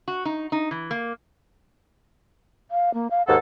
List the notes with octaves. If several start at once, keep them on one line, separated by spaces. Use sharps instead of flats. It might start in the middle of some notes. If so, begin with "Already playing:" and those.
F#4
D#4
D#4
E3
A#3
F5
A#3
F5
D#2 G#2 A4 F#5